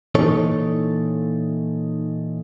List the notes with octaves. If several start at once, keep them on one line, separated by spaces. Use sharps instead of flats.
A#2 E3 D#4 A4 C#5